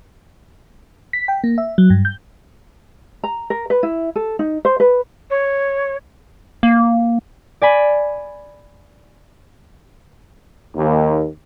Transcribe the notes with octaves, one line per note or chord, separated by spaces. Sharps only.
B6
G5
A#3
E5
F#3
G2
G6
A#5
A#4
B4
E4
A4
D#4
C5
B4
C#5
A#3
D5 G#5 B5
D#2